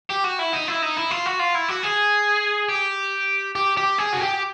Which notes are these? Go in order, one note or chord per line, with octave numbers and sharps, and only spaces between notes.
G4
F#4
E4
D#4
E4
D#4
E4
F4
F#4
F4
E4
F#4
G#4
G4
G4
G4
G#4
F#4
G4